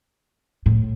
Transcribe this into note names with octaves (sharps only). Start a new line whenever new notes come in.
A2